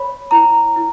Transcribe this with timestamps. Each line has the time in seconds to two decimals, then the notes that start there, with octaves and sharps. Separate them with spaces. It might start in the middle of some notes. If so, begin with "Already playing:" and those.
Already playing: C#5 B5
0.31 E4 A#5
0.76 E4